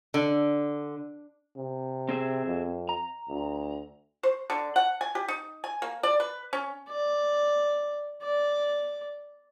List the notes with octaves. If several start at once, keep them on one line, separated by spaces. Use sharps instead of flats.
D3
C3
C4 G#4 E5
F2
A#5
D2
C5
D3
F#5
G#5
G4
D#4
G#5
A#3
D5
B4
C#4
D5
D5